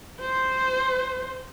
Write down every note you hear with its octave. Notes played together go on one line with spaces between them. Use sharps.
C5